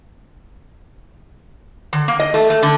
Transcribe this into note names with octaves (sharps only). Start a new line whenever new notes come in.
D3
A#3
D#5
A3
A3
D3